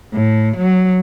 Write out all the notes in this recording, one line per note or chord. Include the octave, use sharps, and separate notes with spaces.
A2
F#3